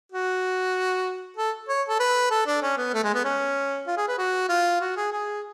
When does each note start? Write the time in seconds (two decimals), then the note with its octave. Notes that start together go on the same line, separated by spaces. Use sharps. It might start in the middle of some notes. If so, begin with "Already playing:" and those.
0.12 F#4
1.37 A4
1.68 C#5
1.88 A4
2.00 B4
2.31 A4
2.46 D4
2.62 C#4
2.77 B3
2.93 A3
3.04 G#3
3.14 B3
3.25 C#4
3.87 F4
3.97 G#4
4.08 B4
4.18 F#4
4.49 F4
4.81 F#4
4.97 G#4
5.12 G#4